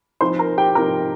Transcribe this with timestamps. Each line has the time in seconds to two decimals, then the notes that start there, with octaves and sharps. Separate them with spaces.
0.21 F3 C4 D#4 C5 C6
0.39 A#4 A#5
0.58 G4 G5
0.75 F3 C4 D#4 A#4 A#5